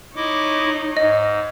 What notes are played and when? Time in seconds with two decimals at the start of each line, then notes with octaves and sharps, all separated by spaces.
0.16 D#4 E4 C#5 D#5 D6
0.97 G#2 D#5